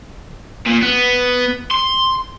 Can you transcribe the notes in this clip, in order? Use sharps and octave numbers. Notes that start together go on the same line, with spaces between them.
A#2
B3
C6